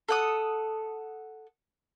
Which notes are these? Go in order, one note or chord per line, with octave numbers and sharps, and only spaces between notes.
A4 F#5 D#6